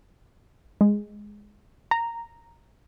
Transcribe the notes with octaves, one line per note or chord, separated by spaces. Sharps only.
G#3
A#5